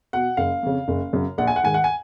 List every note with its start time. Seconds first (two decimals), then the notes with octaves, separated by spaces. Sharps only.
0.13 B2 F#5
0.37 F#1 F5
0.63 F2 C#3
0.88 F#1
1.13 F#2 C#3
1.38 A#1 F#5
1.47 G#5
1.56 F#5
1.63 G#2 D#3 G#5
1.74 F#5
1.84 G#5